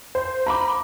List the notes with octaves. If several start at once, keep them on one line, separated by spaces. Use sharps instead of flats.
C5
A#5 B5 D6